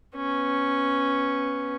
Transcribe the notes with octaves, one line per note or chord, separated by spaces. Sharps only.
B3 C#4